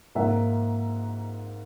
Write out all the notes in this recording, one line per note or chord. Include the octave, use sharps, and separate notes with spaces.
G#2 F3 A#3 E5 F#5